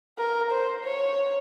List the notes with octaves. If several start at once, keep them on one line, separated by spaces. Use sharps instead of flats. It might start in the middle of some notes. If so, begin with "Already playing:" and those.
A#4
C5
C#5